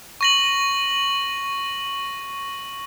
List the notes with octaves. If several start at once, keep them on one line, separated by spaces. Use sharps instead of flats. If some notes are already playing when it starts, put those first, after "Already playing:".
C#6 A#6 F#7